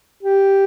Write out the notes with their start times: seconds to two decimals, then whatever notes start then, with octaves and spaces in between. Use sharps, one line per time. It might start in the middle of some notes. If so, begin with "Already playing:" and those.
0.23 G4